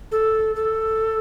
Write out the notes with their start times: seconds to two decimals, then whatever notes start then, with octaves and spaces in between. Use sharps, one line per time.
0.12 A4
0.55 A4